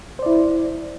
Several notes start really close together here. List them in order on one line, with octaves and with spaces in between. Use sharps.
C5 D5 E4